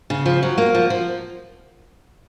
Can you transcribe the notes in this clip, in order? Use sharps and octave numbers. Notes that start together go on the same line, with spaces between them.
C#3
F3
F#3
A#3
F3
F3